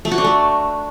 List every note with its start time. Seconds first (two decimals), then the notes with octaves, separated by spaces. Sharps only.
0.05 A3
0.11 F#4
0.18 D4
0.24 A3